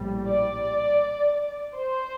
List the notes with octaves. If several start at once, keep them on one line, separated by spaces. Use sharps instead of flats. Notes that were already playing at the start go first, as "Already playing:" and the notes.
Already playing: A#1 A2 G3
D5
C5